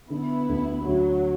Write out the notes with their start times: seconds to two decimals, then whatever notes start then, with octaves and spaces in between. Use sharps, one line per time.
0.10 D3 B3 E4
0.49 D2
0.87 D2 F#3